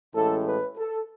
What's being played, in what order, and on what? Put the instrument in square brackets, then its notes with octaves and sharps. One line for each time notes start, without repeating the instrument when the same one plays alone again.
[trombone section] A1 A2 G#3 A4
B4
A4